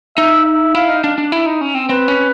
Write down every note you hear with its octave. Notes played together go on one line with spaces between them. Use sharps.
D#4 E5
E5
E4 F5
D#4
D4
D4
E4
D#4
C#4
C4
C4 B4
C#4